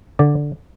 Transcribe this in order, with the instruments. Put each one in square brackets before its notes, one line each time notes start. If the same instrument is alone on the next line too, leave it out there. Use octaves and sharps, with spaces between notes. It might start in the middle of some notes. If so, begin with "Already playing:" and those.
[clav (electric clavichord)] D3 D5